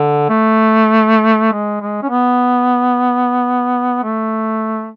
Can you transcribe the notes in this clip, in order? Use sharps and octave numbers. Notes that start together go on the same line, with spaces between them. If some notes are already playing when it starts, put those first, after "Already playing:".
Already playing: D3
A3
G#3
G#3
C#4
B3
A3